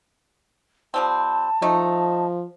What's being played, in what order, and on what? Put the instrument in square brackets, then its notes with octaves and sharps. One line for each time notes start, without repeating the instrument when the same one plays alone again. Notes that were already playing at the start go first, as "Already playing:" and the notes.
[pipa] F3 G3 C4 [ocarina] A5
[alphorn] F3 [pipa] A3 D#4